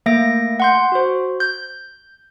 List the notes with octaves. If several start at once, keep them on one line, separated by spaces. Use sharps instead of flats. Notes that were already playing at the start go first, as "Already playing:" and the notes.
A3 A#3 E5 A#6 D7
F#5 C6 G6
F#4 C5
G6